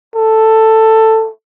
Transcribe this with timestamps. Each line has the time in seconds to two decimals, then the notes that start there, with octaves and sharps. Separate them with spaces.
0.15 A4